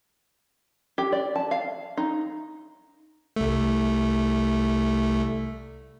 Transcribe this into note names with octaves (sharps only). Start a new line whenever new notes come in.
G4
D5
A5
F5
D#4
C2 A3